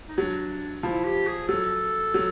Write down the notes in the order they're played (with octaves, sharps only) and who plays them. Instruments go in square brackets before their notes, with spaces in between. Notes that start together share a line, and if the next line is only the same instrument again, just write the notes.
[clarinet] D#4
[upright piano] F#3 [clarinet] D4
[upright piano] F3 [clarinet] E4
[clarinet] G4
G#4
[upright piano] F#3 [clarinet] A4
[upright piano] F#3